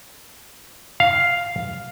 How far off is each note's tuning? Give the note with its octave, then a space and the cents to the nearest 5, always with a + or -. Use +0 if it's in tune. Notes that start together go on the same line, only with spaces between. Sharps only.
F5 +0